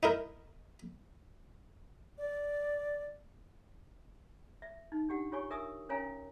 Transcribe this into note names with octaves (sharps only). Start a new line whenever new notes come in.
D#4 E4 A#4
D5
E5
D#4
D4 G4 F#5
F4 G4 C#5 G#5 C#6
A#4 E5 G#5 D#6 E6
C#4 A#4 C#5 F5 G#5 A#5